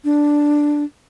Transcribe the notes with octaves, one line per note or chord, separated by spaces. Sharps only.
D4